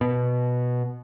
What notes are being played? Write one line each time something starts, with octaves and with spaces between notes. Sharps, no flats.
B2